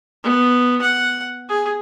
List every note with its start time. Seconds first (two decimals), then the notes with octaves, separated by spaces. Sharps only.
0.23 B3
0.81 F#5
1.48 G#4